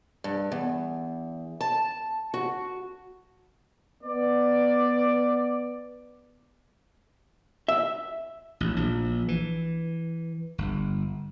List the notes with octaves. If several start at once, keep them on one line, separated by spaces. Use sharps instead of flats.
G2
E2
A5
F#4
B3 D5
E5
A1
A#1
E3
G1